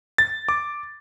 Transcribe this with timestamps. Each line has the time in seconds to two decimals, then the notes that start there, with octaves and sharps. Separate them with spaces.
0.18 A6
0.49 D6